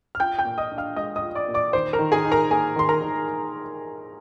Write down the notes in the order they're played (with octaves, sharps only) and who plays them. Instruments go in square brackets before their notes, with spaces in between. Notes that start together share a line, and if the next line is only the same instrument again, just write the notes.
[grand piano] F6
F4 G5 G6
G5 G6
A#2
D#5 D#6
D4
F5 F6
G#3 D#5 D#6
D#5 D#6
F4
D5 D6
A#2
D5 D6
D#3 C5 C6
A#4 A#5
D#3
G#4 G#5
D#4
A#4 A#5
A#3 G#4 G#5
D#3 C6
A#4 A#5
D#3